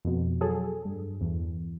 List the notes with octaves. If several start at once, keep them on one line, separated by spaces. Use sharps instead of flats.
F2 B2
F#3 G#4 A4
G2
E2